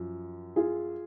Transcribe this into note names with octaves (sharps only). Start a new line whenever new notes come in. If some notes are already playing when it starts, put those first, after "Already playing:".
Already playing: F#2 F3
F4 G#4